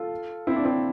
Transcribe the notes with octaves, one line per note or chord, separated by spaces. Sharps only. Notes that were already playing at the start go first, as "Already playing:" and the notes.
Already playing: F4 A4
C4 E4
D4
C4 E4